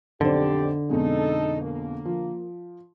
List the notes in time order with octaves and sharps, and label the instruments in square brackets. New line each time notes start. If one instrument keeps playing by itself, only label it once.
[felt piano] B1 F2 C5 [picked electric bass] D3 [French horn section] G4 D5
[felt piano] F2 B2 G#3 [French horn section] D#4 A4
[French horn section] A#3
[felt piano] F3